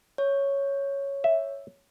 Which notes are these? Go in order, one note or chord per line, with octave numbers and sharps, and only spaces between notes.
C#5
E5